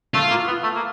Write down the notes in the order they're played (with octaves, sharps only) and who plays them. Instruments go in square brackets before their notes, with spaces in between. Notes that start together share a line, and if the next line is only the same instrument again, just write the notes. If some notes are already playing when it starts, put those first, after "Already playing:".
[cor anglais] A3 [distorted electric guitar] F4
[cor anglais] A#3
B3
A3
A#3